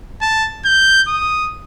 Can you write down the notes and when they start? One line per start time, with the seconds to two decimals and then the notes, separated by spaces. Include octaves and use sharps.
0.21 A5
0.65 G6
1.08 D#6